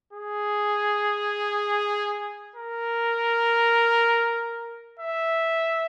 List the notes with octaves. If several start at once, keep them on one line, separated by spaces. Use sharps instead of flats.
G#4
A#4
E5